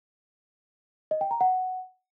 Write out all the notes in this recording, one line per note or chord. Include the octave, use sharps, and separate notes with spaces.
D#5
G5
A#5
F#5